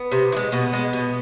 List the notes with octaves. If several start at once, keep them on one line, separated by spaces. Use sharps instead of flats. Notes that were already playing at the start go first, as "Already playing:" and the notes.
Already playing: B3
C3
E3
G#3
B2 B3
G#3
B2